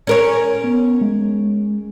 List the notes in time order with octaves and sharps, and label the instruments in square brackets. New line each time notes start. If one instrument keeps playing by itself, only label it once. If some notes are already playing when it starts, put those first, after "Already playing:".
[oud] C#4 A#4 C#5
[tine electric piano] B3
G#3